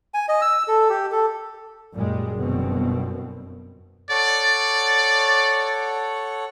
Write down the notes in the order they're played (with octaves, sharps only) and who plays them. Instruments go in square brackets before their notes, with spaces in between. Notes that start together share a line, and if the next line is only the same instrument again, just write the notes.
[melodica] G#5
D#5
E6
A4
G4
A4
[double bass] F#2 [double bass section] A#2 G3 G#3
[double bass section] G1 B2 C4
[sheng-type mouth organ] A4 C#5 F#5 [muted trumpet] D5